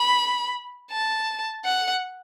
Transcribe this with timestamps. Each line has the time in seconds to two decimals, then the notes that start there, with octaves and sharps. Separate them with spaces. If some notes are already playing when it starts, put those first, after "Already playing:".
Already playing: B5
0.91 A5
1.64 F#5